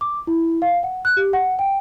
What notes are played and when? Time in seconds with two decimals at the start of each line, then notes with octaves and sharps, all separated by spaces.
0.01 D6
0.27 E4
0.62 F5
0.83 F#5
1.05 F#6
1.17 G4
1.33 F#5
1.59 G5